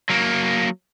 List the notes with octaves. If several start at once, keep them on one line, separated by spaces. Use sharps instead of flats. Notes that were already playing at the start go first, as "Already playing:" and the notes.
F#3 A#3